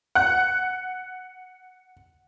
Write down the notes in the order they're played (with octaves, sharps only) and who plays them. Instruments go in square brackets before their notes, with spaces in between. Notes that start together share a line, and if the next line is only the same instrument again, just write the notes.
[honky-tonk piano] F#5 F#6